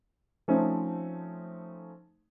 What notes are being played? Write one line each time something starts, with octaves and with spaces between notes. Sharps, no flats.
F3 A3 C4 C#4 D#4